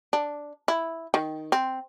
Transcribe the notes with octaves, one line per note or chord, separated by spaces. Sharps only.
D4
E4
D#3
C4